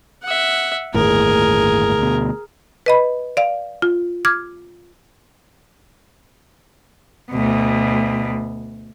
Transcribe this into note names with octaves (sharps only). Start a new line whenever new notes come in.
E5 F#5
G1 D#2 A2 G#4 A#4
D2 B2
B4 D#5 B5
D5 F5
F4
D6 F6 G#6
D2 B2